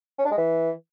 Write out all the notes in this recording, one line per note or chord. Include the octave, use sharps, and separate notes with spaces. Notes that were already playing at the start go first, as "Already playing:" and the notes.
C#4
D4
G#3
E3